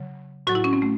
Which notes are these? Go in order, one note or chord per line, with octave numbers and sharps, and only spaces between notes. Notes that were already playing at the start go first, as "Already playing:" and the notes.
Already playing: C#3 F#3
A2 F#3 F#4
E4
C#4
C4
A3